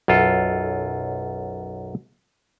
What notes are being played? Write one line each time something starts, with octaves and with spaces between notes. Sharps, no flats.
B1 F#2 F4 A4